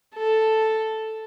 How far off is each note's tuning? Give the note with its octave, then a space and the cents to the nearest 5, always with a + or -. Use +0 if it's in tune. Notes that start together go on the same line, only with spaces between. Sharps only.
A4 +0